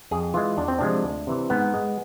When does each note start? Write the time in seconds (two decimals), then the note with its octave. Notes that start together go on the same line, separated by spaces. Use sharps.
0.11 F2 G#4
0.34 E3 G#3 F4
0.57 E2 D4
0.68 C4
0.79 C3 F3 G#3 D4
1.04 D2
1.27 C3 E3
1.50 G#2 B3
1.74 G#3